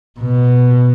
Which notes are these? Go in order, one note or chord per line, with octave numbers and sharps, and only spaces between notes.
B2